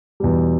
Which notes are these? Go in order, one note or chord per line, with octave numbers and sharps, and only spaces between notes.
E2 B2 G3